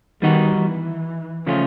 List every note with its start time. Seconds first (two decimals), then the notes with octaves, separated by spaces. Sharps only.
0.22 D#3 G3 B3 D#4 F#4
0.53 E3
1.47 C#3 F3 A3 C#4 F4